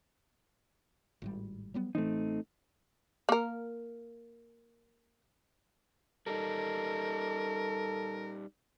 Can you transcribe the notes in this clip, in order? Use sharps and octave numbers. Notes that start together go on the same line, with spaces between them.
G#1 A2 G3
F#3 G3 B3
A1 E3 A3 C4 D#4
A#3 A#4
G3 D#4 A4 A#4